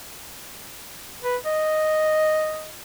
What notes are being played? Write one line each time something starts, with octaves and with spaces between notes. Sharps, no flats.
B4
D#5